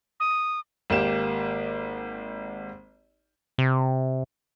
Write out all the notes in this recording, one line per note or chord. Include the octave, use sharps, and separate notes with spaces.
D#6
G#1 A#3 G4 E7
C3